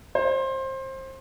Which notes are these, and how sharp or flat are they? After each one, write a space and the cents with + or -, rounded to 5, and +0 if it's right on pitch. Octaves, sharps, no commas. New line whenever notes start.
C5 +25